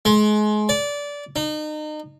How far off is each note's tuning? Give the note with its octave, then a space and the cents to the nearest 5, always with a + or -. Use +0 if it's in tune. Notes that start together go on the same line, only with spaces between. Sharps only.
G#3 +30
D5 -20
D#4 -35